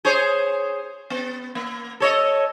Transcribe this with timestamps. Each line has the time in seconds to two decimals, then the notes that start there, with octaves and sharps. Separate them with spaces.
0.05 G#4 C5 C#5
1.10 B3
1.55 A#3
2.00 A4 C#5 D#5